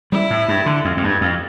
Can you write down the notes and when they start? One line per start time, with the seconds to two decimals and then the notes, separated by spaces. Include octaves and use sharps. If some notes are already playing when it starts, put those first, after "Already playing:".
0.12 G3 E4
0.30 A2
0.48 G2
0.66 D3
0.85 F2
0.97 F2
1.03 G2
1.21 F2